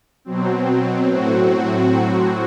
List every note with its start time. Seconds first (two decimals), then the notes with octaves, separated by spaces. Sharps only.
0.25 B2 F#3 C4
1.06 A2 F#3 C4 F#4